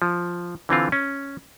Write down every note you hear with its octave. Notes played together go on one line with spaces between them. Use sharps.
F3
D3 E3 C4 F4
C#4